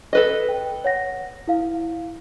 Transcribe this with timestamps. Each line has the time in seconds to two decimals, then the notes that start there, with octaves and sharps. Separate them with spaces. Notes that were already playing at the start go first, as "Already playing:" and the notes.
0.13 A4 B4 D#5
0.49 G5
0.84 C#5 F#5 A#6
1.48 E4 F5